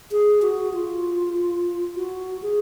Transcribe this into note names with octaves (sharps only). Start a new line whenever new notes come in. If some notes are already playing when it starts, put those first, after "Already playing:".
G#4
F#4
F4
F#4
G#4